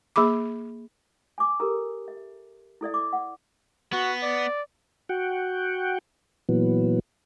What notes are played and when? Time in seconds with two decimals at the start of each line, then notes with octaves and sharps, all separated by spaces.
0.16 A#3 G#4 B5 D6
1.38 G#5 D6
1.60 G4 A4 A#4 A#5
2.08 E5
2.81 E4 A4 D5 E5
2.94 D6
3.13 F#5
3.92 B3 F#4
4.23 D5
5.09 F#4 F#5 G5
6.49 A#2 E3 F#3 B3